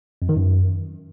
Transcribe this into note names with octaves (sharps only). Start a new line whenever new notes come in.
F2
D#3
F#2